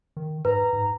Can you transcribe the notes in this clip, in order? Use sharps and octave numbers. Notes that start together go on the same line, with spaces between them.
D#3
G#2 B4 A#5
G#2